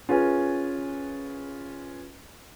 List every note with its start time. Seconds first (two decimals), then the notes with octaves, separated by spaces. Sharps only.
0.09 C#4 F4 G#4 A#4 B4 G#5